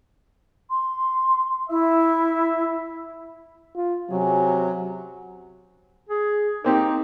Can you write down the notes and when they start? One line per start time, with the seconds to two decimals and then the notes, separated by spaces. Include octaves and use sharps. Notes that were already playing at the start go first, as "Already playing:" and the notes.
0.70 C6
1.70 E4 E5
3.76 F4
4.10 C3 F#3 C#4 G#4
6.09 G#4
6.64 A#3 C4 D#4 G4